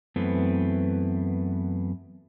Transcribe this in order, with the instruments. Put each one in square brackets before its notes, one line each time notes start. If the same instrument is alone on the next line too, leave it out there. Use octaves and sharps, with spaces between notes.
[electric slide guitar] F#2 E3 A3 B3 C4